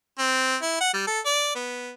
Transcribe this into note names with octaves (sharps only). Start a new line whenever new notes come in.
C4
E4
F#5
G3
A4
D5
B3